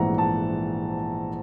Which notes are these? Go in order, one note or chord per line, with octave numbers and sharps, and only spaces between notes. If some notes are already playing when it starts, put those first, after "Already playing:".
Already playing: A#1 G#2 E3 A3 C4 F#5 A#5
A5